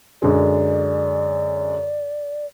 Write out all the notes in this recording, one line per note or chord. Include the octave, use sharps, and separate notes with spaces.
F#2 D3 G#3 D5